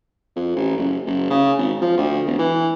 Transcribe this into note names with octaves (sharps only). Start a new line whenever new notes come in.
F2
A1
F#1
F#1
C#3
G#1
F3
D2
E1
E3